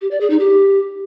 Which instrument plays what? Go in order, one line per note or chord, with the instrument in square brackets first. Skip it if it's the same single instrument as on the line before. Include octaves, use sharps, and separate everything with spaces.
[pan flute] G4
D5
G#4
D#4
G4